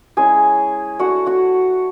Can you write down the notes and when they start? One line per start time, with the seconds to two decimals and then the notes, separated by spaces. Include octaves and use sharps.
0.17 G#3 C#4 E4 G#4 G#5
0.99 A3 D4 F#4 F#5
1.26 F#4 F#5